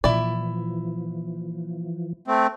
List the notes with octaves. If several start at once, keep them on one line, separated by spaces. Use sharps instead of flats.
A#2 E3 F3 E4 D5
A3 C4